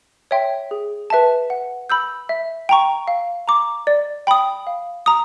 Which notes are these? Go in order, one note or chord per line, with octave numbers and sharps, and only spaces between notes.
C#5 E5 G5 C6
G#4
B4 E5 A5
F#5
B5 E6 G6
E5
G5 A#5 C#6
F5
A#5 D6
D5
G5 B5 D#6
F5
A#5 D#6